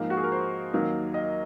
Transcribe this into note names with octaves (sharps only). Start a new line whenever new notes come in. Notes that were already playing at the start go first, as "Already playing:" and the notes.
Already playing: G#2 F3 A#3
F#4
G#4
A#4
C5
D#2 D#3 F#3 A#3 D#4
D#5